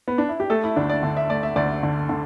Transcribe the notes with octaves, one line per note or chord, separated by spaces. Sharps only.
B3
D4
E4
G4
A3 A4
E4
D2 D4
D5
D3
E5
A3 D5
E5
D2 D5
D3
D3